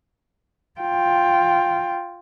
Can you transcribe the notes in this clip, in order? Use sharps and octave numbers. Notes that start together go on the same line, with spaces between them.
F4 G5